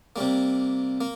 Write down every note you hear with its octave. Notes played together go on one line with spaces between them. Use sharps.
C3 G3 A#3
A#3